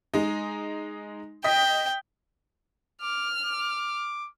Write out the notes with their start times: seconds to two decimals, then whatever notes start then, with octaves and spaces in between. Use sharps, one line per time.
0.14 G#3 D#4
1.44 D#5 G5 D#6 B6
3.02 D6 F6
3.45 D6